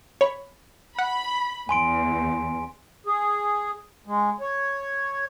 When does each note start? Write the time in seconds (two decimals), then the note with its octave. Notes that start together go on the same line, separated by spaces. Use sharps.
0.21 C#5 B5
0.99 F#5 B5
1.69 E2 G#5 C6 D7
3.06 G#4
4.07 G#3
4.41 C#5